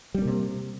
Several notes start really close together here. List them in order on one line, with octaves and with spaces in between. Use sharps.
G3 C#4 A#3 C3